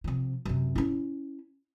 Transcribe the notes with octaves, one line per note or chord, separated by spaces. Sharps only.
C3 F3
F#2 C3
C#4 E4